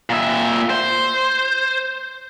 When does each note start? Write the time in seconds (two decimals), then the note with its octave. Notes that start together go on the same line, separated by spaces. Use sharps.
0.10 A#2 E5
0.70 C5